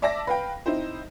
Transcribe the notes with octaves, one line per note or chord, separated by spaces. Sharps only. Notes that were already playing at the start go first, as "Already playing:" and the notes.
D5 E5 A5 D6 A#6
B4 F5 G5
C4 D#4 E4 C5